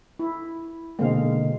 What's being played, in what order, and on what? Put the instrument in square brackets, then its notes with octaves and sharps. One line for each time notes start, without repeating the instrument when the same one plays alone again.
[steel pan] E4
[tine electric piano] B2 D3 A#3 [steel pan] G#3 C4 F5